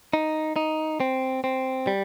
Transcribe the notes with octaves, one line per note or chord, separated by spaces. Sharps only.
D#4
D#4
C4
C4
G3